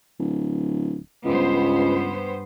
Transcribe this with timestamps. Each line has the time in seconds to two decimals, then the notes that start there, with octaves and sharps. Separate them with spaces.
0.19 D1
1.25 C#2 G2 B3 C5